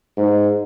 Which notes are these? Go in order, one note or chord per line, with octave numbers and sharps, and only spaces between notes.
G#2